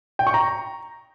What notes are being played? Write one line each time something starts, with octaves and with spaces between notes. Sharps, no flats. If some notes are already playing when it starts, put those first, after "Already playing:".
G5
C#6
A#5